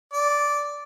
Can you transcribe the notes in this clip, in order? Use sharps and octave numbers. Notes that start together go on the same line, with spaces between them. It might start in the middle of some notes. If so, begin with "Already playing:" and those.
D5